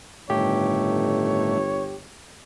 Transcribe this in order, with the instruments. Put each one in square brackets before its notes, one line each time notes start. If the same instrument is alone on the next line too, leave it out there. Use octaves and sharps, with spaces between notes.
[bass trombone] G1 [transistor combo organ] A2 D#3 A3 [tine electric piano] G4 [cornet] C#5